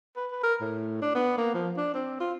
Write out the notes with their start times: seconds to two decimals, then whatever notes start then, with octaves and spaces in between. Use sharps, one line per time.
0.16 B4
0.32 B4
0.44 A#4
0.61 A2
1.02 D4
1.15 B3
1.38 A#3
1.54 F3
1.77 D4
1.94 C4
2.20 F4